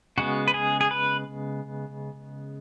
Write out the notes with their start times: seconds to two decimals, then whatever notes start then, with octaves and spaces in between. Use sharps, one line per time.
0.18 C#3 G#3 B3 F#4
0.48 B4
0.54 G#4
0.81 G#4
0.91 B4